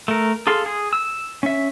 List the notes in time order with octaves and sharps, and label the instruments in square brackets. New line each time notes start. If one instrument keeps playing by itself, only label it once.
[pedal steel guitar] A3 A#4
G#4 A4 F5 C6
G#4
E6
C#4 E5